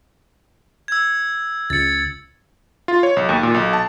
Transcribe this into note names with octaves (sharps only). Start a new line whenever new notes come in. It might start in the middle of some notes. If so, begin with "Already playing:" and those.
E6 G#6
C#2 A6 C#7
F4
C#5
B1
D#2
A#2
B1
A5